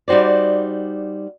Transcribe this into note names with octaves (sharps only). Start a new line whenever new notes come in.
G3 D#4 F#4 C5 D5